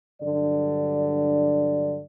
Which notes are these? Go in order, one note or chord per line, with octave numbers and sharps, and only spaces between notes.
G2 D3 F#3 D5